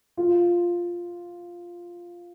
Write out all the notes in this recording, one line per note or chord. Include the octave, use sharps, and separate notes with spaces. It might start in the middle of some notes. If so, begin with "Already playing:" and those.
F4